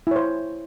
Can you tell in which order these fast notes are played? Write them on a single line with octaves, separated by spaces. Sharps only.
E4 C#5 C5